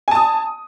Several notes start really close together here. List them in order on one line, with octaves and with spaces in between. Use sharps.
G#5 A5 D#6